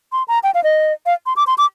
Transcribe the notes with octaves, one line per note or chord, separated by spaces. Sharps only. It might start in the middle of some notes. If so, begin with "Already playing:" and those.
C6
A#5
G5
F5
D#5
F5
C6
D6
C6
D6